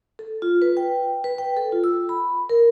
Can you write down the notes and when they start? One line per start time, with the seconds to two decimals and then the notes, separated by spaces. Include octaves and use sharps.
0.19 A4
0.42 F4
0.62 B4
0.77 G5
1.24 B4
1.38 G5
1.57 A4
1.72 F4
1.84 E6
2.09 B5
2.49 A#4